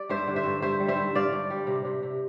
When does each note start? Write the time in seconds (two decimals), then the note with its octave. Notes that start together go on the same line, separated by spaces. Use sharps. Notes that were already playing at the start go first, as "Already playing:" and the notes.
Already playing: G3 D5
0.09 G2 C5 E5
0.27 D3
0.36 C5 E5
0.45 G2
0.62 G2 C5 E5
0.80 G3
0.88 C5 E5
0.97 G2
1.15 G2 D5 F5
1.33 G2
1.50 G3
1.67 C3
1.85 C3
2.03 C3